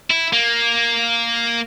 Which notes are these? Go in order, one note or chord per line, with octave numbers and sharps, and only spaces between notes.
E4
A#3